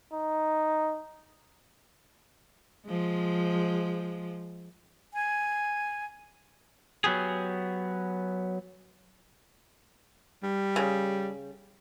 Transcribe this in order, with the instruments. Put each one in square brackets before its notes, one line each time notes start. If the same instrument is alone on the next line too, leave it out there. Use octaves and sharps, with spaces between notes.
[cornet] D#4
[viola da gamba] F3 G#3
[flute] G#5
[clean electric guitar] F#3 B3 G4 G#4
[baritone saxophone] G3
[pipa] C#3